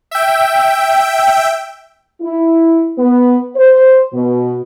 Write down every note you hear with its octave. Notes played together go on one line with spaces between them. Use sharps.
E5 G5
E4
B3
C5
B2